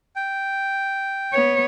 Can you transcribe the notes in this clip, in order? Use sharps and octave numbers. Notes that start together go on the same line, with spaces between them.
G5
B3 C#5